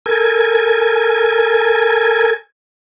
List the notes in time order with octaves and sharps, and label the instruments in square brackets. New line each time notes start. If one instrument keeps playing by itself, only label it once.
[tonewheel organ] A4 A#4 G#5